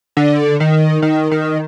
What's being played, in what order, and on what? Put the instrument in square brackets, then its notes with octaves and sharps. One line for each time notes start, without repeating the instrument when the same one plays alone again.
[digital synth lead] D3
D#3
D#3
D#3